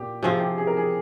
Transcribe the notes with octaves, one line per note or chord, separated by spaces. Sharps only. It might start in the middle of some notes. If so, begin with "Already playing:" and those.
Already playing: A#2 G4
C3 F3 C4 F4 G#4
G4
G#4
A#4
G#4